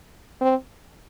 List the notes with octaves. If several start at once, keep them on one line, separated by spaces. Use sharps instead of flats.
C4